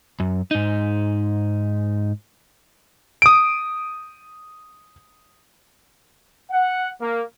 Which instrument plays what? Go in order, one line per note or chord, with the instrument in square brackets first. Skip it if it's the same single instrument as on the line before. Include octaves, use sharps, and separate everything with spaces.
[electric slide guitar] F#2
G#2 D#4
[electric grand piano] D#6 D7
[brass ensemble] F#5
A#3